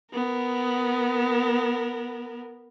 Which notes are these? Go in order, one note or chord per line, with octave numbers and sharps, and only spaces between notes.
B3 A#4